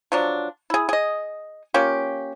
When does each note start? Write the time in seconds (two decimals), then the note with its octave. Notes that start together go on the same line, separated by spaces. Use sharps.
0.12 F3 F#3 D4
0.70 E4 G#4
0.89 G#4 D#5
1.74 A#3 C#4 F4 G4